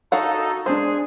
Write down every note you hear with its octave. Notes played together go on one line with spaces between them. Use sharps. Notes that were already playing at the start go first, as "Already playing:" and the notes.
D#4 F#4 A4 F5 F#5
G#3 D4 G#4 C5 C6